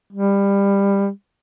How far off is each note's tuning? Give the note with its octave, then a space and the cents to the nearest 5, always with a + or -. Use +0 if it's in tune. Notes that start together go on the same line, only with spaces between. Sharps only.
G3 +20